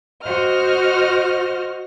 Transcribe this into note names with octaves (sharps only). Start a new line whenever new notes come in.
F#4 C5 D#5 F6